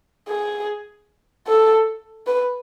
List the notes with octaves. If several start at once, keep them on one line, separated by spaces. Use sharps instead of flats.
G#4
A4
B4